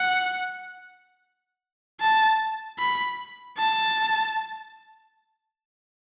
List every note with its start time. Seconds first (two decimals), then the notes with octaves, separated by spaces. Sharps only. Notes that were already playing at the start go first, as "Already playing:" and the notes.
Already playing: F#5
2.01 A5
2.79 B5
3.58 A5